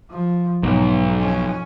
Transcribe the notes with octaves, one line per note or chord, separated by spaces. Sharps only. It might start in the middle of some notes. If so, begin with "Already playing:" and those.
F3
B1 G#2
F2 C#4